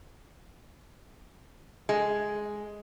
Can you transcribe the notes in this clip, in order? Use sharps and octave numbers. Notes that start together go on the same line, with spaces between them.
G#3